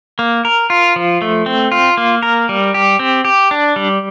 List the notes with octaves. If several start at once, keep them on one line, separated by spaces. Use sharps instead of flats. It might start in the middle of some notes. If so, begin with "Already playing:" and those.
A#3
A#4
F4
F3
A3
C4
F4
A#3
A#4
G3
G4
C4
G4
D4
G3